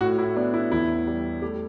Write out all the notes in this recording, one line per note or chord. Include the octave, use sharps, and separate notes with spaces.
A2 F#4
E4
B3 D4
E4
E2 E4
G3
A3 G4